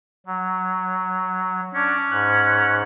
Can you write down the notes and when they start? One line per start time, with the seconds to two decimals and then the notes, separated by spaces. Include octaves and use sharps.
0.26 F#3
1.74 C#4 D4
2.11 G#2 F#6